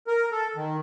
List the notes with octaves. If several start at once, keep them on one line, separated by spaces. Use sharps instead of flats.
A#4
A4
D#3